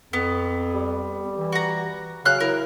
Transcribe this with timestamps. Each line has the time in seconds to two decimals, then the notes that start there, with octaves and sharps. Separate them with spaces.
0.13 F2 B3
0.74 G3
1.38 E3
1.52 F#4 A#5
2.25 C#3 F#3 F5 F#6
2.40 E4 A#4